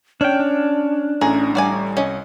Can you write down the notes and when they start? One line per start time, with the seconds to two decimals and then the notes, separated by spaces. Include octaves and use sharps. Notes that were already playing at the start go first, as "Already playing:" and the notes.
0.21 C#4 D4 C#5 G5 F6
0.40 D4
1.21 A1 A2 C#4 G#4 A#5
1.55 G3 F#4 D5 G#5
1.97 C2 C#4 D#5